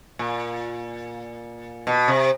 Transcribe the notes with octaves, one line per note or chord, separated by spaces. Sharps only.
A#2
B2
C3